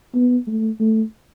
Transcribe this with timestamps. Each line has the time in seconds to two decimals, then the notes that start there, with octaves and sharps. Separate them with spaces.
0.15 B3
0.47 A3
0.80 A3